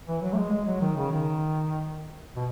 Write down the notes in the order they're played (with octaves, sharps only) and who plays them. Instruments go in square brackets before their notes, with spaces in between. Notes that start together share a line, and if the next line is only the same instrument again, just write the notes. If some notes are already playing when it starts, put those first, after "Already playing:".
[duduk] E3
F#3
A3
G#3
G#3
F#3
D#3
C#3
D#3
B2